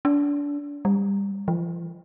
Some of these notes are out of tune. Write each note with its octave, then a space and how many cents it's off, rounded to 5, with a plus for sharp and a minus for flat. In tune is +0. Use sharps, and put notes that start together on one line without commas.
D4 -30
G3 +25
F3 -40